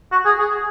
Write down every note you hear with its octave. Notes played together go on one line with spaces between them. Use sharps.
F#4
G#4
G#4